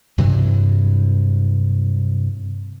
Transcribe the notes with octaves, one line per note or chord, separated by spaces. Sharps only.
G2 C3 E3 F#3